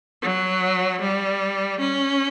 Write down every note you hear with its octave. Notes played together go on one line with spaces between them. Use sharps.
F#3
G3
C#4